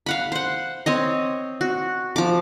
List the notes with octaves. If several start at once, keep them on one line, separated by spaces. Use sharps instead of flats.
F5 F#5 B5
C5 F#5
C4 C#5 D#5
F#4
F3 D6